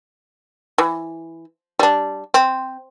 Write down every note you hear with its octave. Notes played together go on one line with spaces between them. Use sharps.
E3
G3 D4
C4